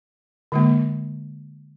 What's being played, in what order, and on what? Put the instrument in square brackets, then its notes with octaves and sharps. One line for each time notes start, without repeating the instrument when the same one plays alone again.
[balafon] D3 G#3 A#3